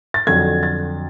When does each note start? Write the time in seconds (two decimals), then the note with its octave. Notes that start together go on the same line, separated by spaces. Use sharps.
0.14 A6
0.27 F2 D3 F#3 G#6
0.63 A6